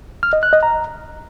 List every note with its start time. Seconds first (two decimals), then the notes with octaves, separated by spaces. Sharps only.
0.23 F6
0.33 D#5
0.43 F#6
0.53 D#5
0.63 A#5